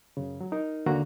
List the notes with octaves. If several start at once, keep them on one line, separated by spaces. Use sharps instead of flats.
F#2 C#3
F#3
D#4 A#4
D#2 D3 A#3 F#4 A#5